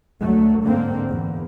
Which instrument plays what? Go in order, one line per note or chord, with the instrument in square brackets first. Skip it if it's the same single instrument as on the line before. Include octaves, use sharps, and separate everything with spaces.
[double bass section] D2 F#3 A3
G#2 D3 A#3 C4
E2